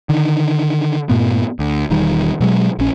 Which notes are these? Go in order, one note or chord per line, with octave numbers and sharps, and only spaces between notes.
D3 D#3
G2 A#2 A3 B3
D2
E1 E2 D#3 G3
B2 F#3 G#3
A#1 C#4